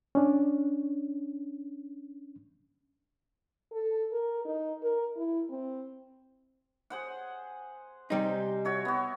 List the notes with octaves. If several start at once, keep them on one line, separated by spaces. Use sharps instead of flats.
C#4 D4
A4
A#4
D#4
A#4
E4
C4
G#4 C5 F#5
C3 G3 D#4 C5
F#4 C#5 E5
B3 F#4